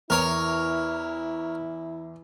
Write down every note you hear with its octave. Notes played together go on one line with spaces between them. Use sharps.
E2 E4 A#4 C#5